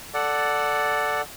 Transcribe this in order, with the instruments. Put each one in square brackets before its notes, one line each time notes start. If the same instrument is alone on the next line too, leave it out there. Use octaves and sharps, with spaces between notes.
[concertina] A4 D5 F#5